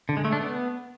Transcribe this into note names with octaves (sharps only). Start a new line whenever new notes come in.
D3
G#3
A3
D4
B3